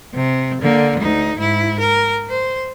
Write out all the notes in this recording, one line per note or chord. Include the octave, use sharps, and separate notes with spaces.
C3
D3 A#3
D2 D#4
G#2 E4
A#4
C5